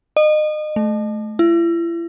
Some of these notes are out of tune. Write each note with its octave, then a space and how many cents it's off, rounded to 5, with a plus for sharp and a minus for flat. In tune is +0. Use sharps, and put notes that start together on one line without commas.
D#5 -30
A3 -25
E4 +40